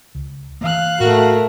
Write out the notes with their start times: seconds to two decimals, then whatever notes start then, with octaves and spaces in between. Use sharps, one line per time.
0.15 C#2
0.61 E3 A#3 F5 F#6
1.00 A2 A3 F#4 A#4